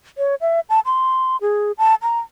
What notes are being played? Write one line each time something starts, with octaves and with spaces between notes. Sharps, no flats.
C#5
E5
A5
C6
G#4
A5
A#5